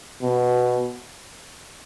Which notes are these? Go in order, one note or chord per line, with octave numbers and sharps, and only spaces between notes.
B2